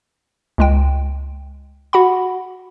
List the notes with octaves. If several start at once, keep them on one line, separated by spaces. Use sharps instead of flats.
C#2 G#3 G5
F#4 F#5 B5